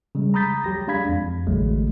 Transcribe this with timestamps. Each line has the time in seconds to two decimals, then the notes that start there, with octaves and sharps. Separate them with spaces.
0.15 C#3 G3 G#3
0.34 A#5 B5 D#6 G6 A6 B6
0.64 F#3 G4 A#6
0.88 G#3 D4 F5 B5 G#6 B6
1.09 F2
1.47 A1 D3 F#3 G#3 A3